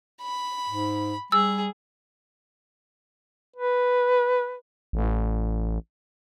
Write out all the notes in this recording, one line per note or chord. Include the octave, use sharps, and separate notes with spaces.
B5
G#2
G3 G#4 E6
B4
A1